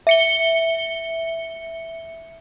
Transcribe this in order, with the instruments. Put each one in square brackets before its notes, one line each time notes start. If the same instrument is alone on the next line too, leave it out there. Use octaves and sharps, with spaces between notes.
[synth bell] E5 C#7 G7